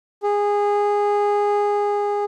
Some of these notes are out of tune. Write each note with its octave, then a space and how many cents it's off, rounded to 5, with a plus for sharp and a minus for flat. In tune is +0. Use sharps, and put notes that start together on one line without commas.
G#4 -15